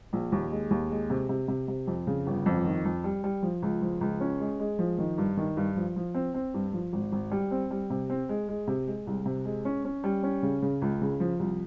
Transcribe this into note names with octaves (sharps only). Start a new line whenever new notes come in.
A#1
D#2
G#3
D#2
G#3
C3
C3
C3
C3
F2
C#3
G1
F2
D#3
F2
G3
G3
F3
C#2
F3
C#2
C#4
G#3
G#3
F3
D#3
G2
D#3
G2
F3
F3
C4
C4
G2
F3
G#1
G#1
G3
C4
G3
C3
C4
G#3
G#3
C3
G#3
C2
C3
G#3
C#4
C#4
G3
C#4
C#3
C#3
C#2
C#3
F3
C2